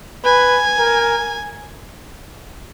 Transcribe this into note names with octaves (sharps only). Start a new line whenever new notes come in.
B4 G#5
A#4